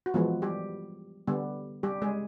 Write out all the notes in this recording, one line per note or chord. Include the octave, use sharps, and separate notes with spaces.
F#4
E3 F3 G#3 B3 F4
G3 G4
D3 G3 B3
G3 G4
G#3 G#4